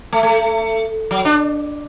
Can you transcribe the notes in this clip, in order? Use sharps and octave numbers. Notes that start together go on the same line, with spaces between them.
A3
A3
F#3
D4